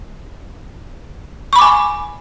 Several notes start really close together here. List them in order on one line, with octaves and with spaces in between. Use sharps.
C#6 B5 D6 G#5